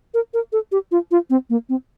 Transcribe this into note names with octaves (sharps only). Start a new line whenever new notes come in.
A#4
A#4
A4
G4
F4
F4
C4
A#3
C4